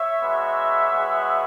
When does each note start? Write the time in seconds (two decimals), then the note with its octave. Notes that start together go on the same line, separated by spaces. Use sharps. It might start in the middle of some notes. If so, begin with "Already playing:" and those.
Already playing: C#5 E5
0.20 G#3 B3 F#4
0.89 G#3 B3 F#4